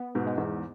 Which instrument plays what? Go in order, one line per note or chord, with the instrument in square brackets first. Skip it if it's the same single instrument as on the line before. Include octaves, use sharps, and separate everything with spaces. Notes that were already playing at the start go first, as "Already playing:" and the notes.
Already playing: [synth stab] B3
[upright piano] G#2 B2
[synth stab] G#3
[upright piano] E2 G#2